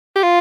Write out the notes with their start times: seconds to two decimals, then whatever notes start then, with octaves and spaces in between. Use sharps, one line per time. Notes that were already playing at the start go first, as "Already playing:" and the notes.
0.16 G4
0.23 F4